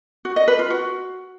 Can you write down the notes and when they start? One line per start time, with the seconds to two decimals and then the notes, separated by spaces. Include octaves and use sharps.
0.25 F#4
0.36 D#5
0.48 B4
0.59 F4
0.70 F#4